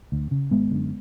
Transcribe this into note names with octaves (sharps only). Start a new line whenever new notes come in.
D2
C#3
G#1 G#3 B3
F#2 D3